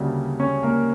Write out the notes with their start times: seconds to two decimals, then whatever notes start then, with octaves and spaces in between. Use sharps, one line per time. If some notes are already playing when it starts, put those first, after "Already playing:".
Already playing: D2 C#3 G3 A#3 D4
0.40 C#4 C#5
0.63 A#3 A#4